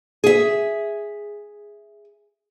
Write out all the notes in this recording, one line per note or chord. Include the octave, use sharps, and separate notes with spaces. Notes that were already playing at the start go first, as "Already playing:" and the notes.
G#4 E5